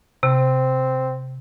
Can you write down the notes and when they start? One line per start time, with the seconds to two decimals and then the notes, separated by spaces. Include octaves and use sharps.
0.23 C3 C4